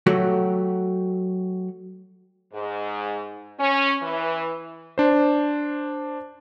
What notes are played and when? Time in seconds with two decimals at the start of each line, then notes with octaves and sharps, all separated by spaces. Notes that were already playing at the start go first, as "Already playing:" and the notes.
0.07 F#3 A3 F#4 G4
2.54 G#2
3.59 C#4
4.03 E3
4.98 D4 C5